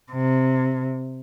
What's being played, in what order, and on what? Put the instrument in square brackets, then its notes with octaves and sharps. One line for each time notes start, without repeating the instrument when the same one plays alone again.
[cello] C3